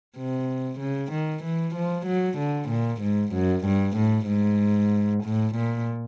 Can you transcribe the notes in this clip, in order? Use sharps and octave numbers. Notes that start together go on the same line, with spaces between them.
C3
C#3
D#3
E3
F3
F#3
D3
A#2
G#2
F#2
G2
A2
G#2
A2
A#2